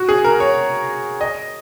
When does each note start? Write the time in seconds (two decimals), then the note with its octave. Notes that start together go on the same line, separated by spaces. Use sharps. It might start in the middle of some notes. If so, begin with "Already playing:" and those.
Already playing: F#4
0.09 G#4
0.24 A#4
0.40 C#5
1.21 D#5